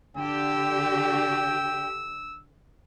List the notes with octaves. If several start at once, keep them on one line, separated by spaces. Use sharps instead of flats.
D3 G4 G5 E6